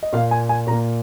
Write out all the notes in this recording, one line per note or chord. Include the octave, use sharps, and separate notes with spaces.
D#5
A#2 A#3 F5
G#5
G#5
A#2 A#3 A#5